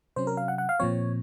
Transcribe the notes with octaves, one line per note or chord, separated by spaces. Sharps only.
C3 F#3 C#4 C5
A#4
F5
F#5
F#5
F5
A#2 F3 C4 C#5